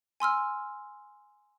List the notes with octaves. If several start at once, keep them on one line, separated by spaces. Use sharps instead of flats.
G#5 C6 E6 F6